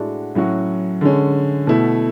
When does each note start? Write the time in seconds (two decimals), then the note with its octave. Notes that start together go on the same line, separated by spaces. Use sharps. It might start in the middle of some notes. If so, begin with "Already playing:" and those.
Already playing: A2 G#3 D4 F#4
0.35 A2 F#3 C#4 F#4
1.01 D3 G#3 C#4
1.67 B2 A3 E4